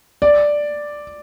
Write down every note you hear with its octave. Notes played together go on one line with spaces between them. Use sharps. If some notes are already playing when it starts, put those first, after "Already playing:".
D5